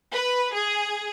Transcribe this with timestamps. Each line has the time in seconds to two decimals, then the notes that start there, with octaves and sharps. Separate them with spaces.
0.13 B4
0.54 G#4